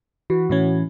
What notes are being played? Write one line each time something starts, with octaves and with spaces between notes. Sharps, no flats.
E3 F#4
A2 E3 C#4